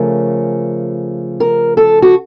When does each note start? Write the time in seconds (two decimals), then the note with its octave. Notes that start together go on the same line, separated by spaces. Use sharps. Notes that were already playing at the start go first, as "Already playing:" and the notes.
Already playing: C#3 F3 A3 C#4 A#4
1.40 A#4
1.77 A4
2.02 F#4